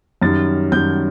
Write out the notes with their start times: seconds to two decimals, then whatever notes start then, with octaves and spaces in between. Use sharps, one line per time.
0.22 F#2 D#3 G3 A6
0.72 F#2 D#3 G3 G6